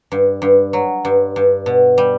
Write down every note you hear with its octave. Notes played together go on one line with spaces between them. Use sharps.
G2
G2
F#3
G2
G2
B2
G3